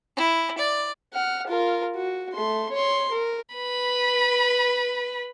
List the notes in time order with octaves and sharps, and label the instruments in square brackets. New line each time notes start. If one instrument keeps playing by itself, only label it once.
[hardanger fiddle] E4
D5
[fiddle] F#5 F6
F4 A#4
F#4
A3 C6
C#5 C6
A#4
[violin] B4 B5